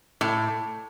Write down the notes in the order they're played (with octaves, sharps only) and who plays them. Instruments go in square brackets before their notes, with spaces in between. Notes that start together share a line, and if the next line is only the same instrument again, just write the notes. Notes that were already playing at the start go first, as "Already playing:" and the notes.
[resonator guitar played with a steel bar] A2